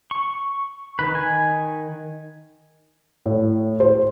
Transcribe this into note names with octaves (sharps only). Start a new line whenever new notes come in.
C#6
D#3 B4
D#3 G#5
A2
C5